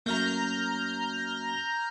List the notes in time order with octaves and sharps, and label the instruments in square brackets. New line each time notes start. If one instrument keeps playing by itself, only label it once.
[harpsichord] F#2 A3 [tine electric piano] A#3 [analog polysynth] A#5 F6 G6